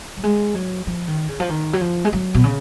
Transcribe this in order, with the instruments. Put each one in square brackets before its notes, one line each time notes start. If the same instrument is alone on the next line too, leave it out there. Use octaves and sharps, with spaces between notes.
[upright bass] F#3
G#3
F#3
F3
D#3
C#3
F3
D#3
F#3
F3
G#3
F#3
B2
C#3